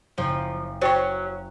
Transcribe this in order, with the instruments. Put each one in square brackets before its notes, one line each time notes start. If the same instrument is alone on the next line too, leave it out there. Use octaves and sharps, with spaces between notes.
[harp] F#1 [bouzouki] F3
[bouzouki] F#3 C#4 [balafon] C5 G5 C#6 [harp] F#6